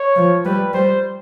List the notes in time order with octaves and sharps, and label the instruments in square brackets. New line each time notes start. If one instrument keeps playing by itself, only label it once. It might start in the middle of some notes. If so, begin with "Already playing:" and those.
Already playing: [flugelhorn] C#5
[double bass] F3
[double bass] G3 [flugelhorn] B4
[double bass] G3 [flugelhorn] C5